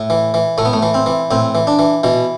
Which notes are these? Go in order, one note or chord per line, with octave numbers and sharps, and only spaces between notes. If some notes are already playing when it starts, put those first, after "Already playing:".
Already playing: A2
E3
E3
A2 A3
B3
A3
E3
C4
E3
A2 C4
E3
D4
E3
B2 E3